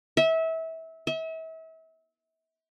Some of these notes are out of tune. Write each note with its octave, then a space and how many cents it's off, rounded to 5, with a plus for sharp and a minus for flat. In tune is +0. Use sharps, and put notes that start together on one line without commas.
E5 -25
E5 -35